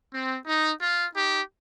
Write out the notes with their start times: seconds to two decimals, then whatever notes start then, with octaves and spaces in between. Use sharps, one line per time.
0.12 C4
0.46 D#4
0.81 F4
1.15 D#4 G4